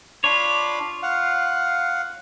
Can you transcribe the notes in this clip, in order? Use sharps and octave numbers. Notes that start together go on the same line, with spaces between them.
D4 F4 C#5 B5 D6
F5 F#5